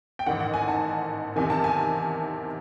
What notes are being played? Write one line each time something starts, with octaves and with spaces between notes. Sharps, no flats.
G5
A1 G#2 D#3 F#5
F#5
G#5
A5
E2 C3 D#3 G#5
A5
G#5